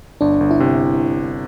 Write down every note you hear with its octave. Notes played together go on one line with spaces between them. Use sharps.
G1 D4
G1
E4
C3